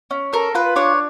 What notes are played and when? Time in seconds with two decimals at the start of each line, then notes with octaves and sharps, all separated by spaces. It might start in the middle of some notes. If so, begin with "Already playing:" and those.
0.11 C#4
0.33 A4 A#4
0.55 F4 B4
0.76 D4 C#5